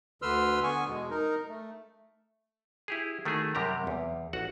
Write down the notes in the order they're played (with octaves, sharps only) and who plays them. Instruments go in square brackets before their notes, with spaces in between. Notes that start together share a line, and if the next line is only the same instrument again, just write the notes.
[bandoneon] D2 D3 B4 C6 E6 F6
D3 B3 G#5 C#6
E2 B2 G#3
D#4 A#4
A3
[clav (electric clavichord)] E4 G4 G#4
D#3 A3 F#4 G#4
F#2 C3 G3 G4 A#4 A#5
E2
A1 F#4 F#5